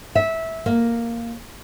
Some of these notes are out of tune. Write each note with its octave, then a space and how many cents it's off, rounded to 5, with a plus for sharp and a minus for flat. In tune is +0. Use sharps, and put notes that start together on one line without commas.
E5 -15
A#3 -5